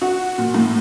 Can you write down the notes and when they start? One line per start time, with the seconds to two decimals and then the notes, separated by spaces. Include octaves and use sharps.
0.01 F#4
0.38 A#2
0.54 A2